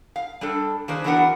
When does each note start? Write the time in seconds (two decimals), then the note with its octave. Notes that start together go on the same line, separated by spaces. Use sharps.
0.16 F5
0.41 G3 D4 A4
0.88 D#3 A#3 D4 G#4 B4 C5
1.04 E3 F#3 B3 D4 A#4 F#5